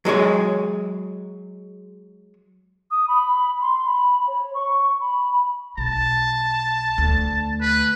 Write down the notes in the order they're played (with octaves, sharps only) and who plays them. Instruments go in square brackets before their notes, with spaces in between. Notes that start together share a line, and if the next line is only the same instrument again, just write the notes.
[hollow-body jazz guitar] F#3 G#3 G#4 C#5
[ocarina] D#6
B5
C6
B5
C#5
C#6
B5
[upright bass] B1 [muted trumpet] A5
[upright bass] D2
[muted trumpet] B4